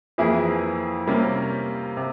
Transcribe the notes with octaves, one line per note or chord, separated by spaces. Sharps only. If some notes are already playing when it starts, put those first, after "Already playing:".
F2 E3 A#3 E4 G#4
C3 G3 A#3 C#4
C3